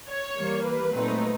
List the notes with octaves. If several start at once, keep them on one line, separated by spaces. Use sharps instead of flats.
C#5
E3 G3 A#3
B4
A#2 F#3 A3 C4 D#4